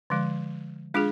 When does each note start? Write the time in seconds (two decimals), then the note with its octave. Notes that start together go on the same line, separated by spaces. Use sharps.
0.10 D3 F3 G#3
0.94 G#3 D4 F4 G#4